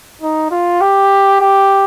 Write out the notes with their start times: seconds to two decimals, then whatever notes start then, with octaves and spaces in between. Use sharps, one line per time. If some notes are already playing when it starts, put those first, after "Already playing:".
0.22 D#4
0.51 F4
0.81 G4
1.40 G4